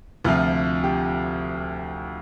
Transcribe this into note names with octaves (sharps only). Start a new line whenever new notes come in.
D2 C3 F3 F4
G4